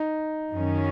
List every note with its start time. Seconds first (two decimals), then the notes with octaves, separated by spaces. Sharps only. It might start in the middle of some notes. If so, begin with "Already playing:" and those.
Already playing: D#4
0.52 F#2 D#3 F#3 C#4